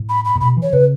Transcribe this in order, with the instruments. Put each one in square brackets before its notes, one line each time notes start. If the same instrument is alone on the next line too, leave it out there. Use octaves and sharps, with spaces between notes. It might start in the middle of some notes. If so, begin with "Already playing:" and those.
Already playing: [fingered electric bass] A2
[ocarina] B5
B5
[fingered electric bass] A2
[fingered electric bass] B2 [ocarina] B5
[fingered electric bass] E3
[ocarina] C#5
[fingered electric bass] C#3 [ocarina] B4